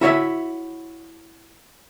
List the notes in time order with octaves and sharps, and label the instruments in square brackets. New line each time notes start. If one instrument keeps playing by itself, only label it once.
[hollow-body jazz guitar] E4 F#4 C#5 E5